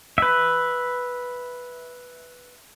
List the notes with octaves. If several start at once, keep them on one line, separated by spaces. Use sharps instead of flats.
B4 E5